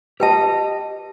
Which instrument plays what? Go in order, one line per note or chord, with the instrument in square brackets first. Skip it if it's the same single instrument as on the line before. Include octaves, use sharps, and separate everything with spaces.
[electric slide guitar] G4 D#5 [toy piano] B4 G5 A5